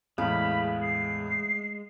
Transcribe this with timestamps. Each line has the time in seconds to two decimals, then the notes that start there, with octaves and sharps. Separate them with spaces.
0.18 E2 A2 G#3 F5 B5
0.82 C7